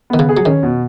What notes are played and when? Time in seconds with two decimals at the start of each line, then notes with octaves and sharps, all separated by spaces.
0.10 D#3 B3
0.19 C#3
0.29 G#4
0.37 F#3
0.45 D#3 C#4
0.63 B2